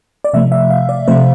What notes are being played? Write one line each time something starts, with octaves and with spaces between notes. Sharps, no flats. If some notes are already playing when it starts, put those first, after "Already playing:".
D5
C3 F3 A3 E5
E5
F5
D5
C3 F3 A3 C5